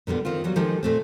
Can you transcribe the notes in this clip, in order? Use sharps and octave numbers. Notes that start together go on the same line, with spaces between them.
A#2 D3 G3 B3
D#3 C4 F4
F#3 G3 B3
D#3 F3 G#3 D#4 G4 A4
A#2 A3 C4